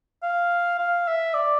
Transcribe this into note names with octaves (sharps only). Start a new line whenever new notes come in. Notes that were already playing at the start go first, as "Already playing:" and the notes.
F5
F5
E5
D5